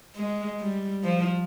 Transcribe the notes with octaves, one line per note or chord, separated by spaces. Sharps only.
G#3
G3
F3